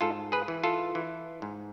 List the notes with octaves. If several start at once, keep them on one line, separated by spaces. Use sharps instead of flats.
G#2 F4 A4
G#4 B4
E3
F4 A4
E3
G#2